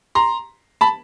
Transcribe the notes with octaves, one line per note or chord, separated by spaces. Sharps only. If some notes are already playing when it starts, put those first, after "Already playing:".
A#5 C6
A5 B5